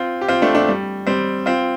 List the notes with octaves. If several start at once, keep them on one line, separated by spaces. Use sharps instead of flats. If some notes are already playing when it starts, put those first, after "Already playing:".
Already playing: C4 F4
G4
C4 F4
A3 D4
A3 D4
G3
G3 C4
C4 F4